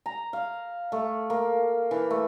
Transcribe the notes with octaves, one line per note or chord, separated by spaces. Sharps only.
A#5
F5
A3
A#3
E3
A3